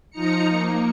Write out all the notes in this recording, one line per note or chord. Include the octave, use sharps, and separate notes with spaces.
F3 D#4 A#5 C#7
A#3